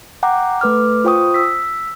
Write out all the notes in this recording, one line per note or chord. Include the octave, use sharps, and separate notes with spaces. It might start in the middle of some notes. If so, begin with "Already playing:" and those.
F#5 G5 A#5 D6
A3 B4 D6 F6
F4 C5 G5 C#6 D#6
E6 B6